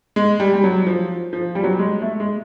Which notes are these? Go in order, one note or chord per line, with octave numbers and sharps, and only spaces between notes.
G#3
G3
G3
F#3
F3
F3
G3
F#3
G3
G#3
A3
G#3